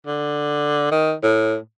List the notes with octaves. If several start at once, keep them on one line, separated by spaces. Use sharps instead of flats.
D3
D#3
A2